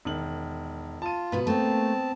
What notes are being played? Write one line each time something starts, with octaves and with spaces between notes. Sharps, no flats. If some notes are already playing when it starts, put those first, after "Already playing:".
E1 D#3 F#7
F4 A5 D#7
G#2 B2 B3 B4
A3 A#3 C4 A5